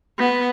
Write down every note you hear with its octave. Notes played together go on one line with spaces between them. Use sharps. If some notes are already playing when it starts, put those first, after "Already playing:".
B3